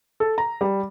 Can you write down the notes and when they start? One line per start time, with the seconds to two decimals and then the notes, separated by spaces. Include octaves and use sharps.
0.20 A4
0.38 A#5
0.61 G3